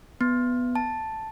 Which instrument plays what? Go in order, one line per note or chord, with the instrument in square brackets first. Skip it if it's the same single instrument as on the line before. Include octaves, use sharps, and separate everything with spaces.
[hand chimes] B3
A5